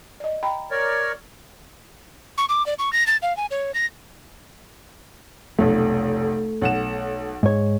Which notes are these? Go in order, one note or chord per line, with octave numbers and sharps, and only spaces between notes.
D5 D#5
G5 A#5 B5
A#4 C#5 D5
C#6
D6
D5
C#6
A#6
A6
F5
G#5
C#5
A#6
F1 B1 A3
B1 F#5 E7
G#2 C#5